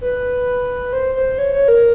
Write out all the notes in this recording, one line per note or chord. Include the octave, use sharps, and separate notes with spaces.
B4
C5
C5
C#5
C#5
A#4